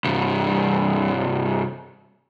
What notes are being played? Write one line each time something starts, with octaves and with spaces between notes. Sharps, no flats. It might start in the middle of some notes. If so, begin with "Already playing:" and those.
C2 G2